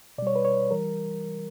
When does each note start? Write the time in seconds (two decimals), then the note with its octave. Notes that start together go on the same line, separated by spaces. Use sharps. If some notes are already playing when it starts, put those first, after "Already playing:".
0.18 B2 D5
0.22 G3 C#5
0.36 B4
0.45 C#5
0.71 E3 G3 A#4